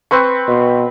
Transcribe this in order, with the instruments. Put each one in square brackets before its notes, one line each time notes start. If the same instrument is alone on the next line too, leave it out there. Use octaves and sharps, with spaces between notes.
[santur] C4 B4 C#6
[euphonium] B2